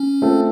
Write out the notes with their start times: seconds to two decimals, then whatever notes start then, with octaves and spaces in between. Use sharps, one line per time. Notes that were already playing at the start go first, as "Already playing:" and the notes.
Already playing: C#4
0.22 A3 C4 F4 A4